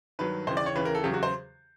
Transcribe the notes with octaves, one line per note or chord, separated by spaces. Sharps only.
G2 D#3 F#3 B4
D#2 C#3 E3 C5
D5
C#5
D#2 C#3 E3 B4
A#4
A4
E2 C#3 F#3 G4
F#4
C5